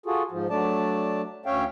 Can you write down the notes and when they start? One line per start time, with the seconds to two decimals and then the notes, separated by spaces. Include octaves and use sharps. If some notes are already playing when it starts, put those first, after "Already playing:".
0.06 F4 F#4 G#4 A4
0.31 G#2 F3
0.50 F#3 A3 D4 D5 A5
1.46 D2 C#4 C#5 E5 F5 G5